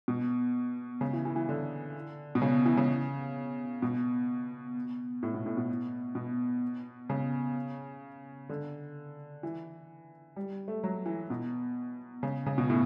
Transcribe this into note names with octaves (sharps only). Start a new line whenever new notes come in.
B2
C#3
E3
E3
E3
D3
B2
C#3
E3
C#3
B2
A2
B2
A2
B2
B2
C#3
D3
E3
G3
A3
F#3
E3
B2
C#3
C#3
B2
A2